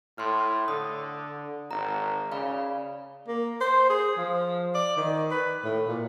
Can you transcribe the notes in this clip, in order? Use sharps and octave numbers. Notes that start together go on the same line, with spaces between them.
A2 C6 F6
D3 D#6
G#1 A#5
C#3 D5 F5 B5
A#3
C5
G#4
F3
D5
D#3
B4
A2
A#2